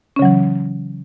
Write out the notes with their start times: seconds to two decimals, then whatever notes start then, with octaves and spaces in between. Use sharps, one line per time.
0.16 C#4
0.19 C#3
0.22 F#3
0.25 E3